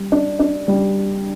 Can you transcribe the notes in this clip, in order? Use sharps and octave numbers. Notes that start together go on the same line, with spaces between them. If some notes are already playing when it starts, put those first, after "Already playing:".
Already playing: G3
D4
D4
G3